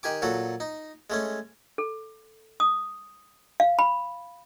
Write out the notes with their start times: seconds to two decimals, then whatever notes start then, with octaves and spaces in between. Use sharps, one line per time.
0.03 D#3 G4 G#5 D6
0.22 A#2 F#3 F#4 A4
0.60 D#4
1.10 G#3 A3 C#4
1.78 A4
2.60 D#6
3.60 F5
3.79 B5